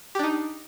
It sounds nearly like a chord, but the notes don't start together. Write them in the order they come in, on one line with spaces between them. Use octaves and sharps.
G4 D4 D#4